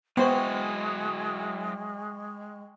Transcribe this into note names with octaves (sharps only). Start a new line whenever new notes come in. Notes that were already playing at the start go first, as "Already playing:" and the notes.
F#3 G#3 B3 E4 F#4 C5 G5 C#6